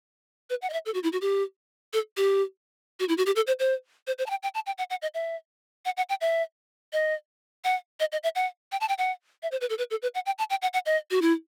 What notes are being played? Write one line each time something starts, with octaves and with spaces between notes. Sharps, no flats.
B4
F#5
D#5
E5
A4
F#4
E4
F#4
G4
A4
G4
F#4
E4
F#4
G4
A4
C5
C5
C5
C5
A5
G5
G5
A5
G5
F#5
F#5
D#5
E5
F#5
F#5
G5
E5
D#5
F#5
D#5
D#5
E5
F#5
G5
A5
G5
F#5
E5
C5
B4
A4
B4
A4
B4
F#5
G5
A5
G5
F#5
F#5
D#5
F#4
E4